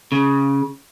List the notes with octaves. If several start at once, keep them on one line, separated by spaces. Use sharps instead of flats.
C#3